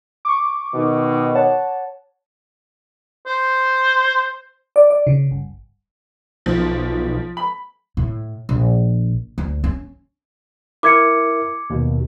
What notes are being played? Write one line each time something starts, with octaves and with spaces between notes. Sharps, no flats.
C#6 D6
B2 D#3
C#5 F#5 A5
C5
D5
D5
C#3
G1
B1 F3
B5
A2
A#1
D2
C#4
E4 A#4 E5 D6 G#6 C#7
D#2 B2